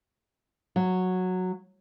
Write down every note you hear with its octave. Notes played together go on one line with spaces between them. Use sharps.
F#3